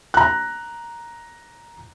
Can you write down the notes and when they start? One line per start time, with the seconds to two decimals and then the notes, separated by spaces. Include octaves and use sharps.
0.14 A#5 F#6